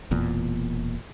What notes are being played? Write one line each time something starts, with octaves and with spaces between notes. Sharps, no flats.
E1 E2 A#2